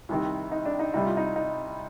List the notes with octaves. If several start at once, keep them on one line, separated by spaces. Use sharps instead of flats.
C2 C3 D#3
D#4
D4
D#4
C2 C3 G3 D#4
F4
D#4
D#4